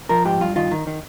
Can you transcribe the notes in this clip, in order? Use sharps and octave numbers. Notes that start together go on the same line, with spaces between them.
F3 A#4
G#2 G4
G2 F4
D#3 F4
D#3
D#3